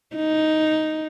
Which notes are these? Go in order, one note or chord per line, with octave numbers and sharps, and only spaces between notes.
D#4